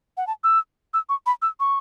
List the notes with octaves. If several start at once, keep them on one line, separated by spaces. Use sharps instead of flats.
F#5
A5
E6
E6
C#6
B5
E6
C#6